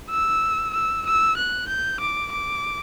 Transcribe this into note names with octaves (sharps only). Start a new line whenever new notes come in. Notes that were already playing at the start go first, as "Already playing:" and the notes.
E6
E6
E6
F#6
G6
D6
D6